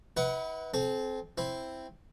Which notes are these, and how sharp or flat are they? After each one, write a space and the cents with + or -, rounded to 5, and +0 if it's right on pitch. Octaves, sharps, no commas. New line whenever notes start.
E4 -45 B4 +0 F#5 +15
C4 -5 A4 -40
C4 +0 E4 +0